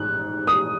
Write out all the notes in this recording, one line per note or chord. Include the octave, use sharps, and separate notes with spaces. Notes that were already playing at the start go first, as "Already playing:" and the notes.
Already playing: G#2 D#4 F#6
D#6